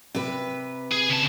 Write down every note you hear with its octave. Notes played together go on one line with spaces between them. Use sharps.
C3 B4
G#4
C#3 A5